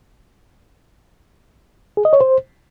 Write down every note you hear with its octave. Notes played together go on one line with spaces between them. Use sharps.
G#4
D#5
C#5
C5